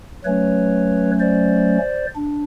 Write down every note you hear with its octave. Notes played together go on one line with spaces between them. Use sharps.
F#3 A3 C#4 B4 C#5
C5 D5
D4